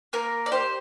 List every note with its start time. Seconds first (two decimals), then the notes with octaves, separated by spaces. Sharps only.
0.13 A#3 A#4
0.46 D5
0.52 G4 C5